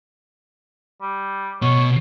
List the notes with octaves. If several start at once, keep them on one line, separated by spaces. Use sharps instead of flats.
G3
B2 C#5